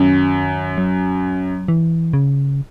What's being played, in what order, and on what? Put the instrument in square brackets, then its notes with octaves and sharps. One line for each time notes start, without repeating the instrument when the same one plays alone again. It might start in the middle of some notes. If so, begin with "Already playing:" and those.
Already playing: [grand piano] F#2 [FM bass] D#3
[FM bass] F#3
E3
C#3